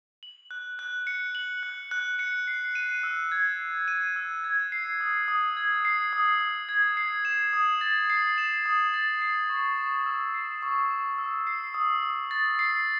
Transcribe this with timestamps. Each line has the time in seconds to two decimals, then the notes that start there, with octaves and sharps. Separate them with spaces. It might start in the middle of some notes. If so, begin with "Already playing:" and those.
0.23 F#7
0.51 F#6
0.79 F#6
1.07 C#7
1.35 F#7
1.63 F#6
1.91 F#6
2.19 C#7
2.48 C7
2.75 D#7
3.03 E6
3.32 G#6
3.60 C7
3.88 D#7
4.16 E6
4.44 G#6
4.72 C7
5.01 D#6
5.28 D#6
5.57 G#6
5.85 C7
6.13 D#6
6.41 D#6
6.69 G#6
6.97 C7
7.25 E7
7.53 D#6
7.81 A6
8.10 C7
8.38 E7
8.66 D#6
8.94 A6
9.22 C7
9.50 C#6
9.78 C#6
10.06 E6
10.34 C7
10.62 C#6
10.90 C#6
11.18 E6
11.47 C7
11.74 D#6
12.03 D#6
12.31 A6
12.59 C7